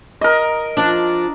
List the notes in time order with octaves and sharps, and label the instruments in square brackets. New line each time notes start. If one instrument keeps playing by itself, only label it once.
[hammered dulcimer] A#4 D#5
[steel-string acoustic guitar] F3 F4 [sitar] D4